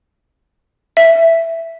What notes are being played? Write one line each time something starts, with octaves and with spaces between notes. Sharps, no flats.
E5